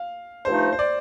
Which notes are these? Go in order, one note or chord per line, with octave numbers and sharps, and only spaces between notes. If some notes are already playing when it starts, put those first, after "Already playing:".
Already playing: F5
G2 F3 A3 D#4 C5
C5
D5